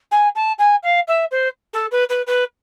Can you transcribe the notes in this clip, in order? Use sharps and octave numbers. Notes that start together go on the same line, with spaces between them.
G#5
A5
G#5
F5
E5
C5
A4
B4
B4
B4